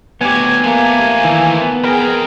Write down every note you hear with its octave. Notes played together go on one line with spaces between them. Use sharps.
D2 F#3 B3 G4 G#5
F3 A3 A#3
D#3 E3
B3
F2 G#4 A#4 G5